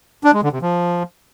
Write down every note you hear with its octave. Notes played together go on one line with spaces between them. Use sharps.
D4
G#3
D3
C3
F3